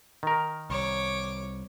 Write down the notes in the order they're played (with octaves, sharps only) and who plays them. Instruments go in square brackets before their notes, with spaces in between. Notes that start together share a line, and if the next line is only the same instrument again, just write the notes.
[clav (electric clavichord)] D#3 A#4
[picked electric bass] C2 [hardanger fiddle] C#5 D6